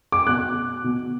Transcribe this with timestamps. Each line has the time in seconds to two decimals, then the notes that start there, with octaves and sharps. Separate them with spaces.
0.12 D6
0.27 B2 F#6
0.84 B2